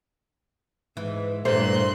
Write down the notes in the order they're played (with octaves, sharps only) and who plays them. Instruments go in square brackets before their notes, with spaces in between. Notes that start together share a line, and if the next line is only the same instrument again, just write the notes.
[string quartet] G#2 [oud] E3
[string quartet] G2 C6 F#6 [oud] A#2 E3 A3 [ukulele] C5